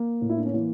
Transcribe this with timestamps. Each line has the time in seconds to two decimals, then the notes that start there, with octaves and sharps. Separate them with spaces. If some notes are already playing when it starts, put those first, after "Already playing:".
Already playing: A#3
0.21 A2
0.30 E4
0.37 D4
0.46 C#4
0.54 E3 A#3